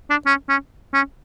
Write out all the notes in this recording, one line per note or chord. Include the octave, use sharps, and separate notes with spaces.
D4
C#4
C#4
C#4